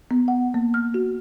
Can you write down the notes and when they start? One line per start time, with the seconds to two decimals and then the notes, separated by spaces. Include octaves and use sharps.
0.11 B3
0.28 F#5
0.54 A#3
0.74 F6
0.94 F#4